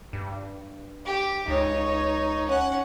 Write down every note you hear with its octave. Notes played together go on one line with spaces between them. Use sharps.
G2
G4
C#2 D#4 C#5
C#4 F#5